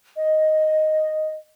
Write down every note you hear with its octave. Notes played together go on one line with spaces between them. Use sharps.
D#5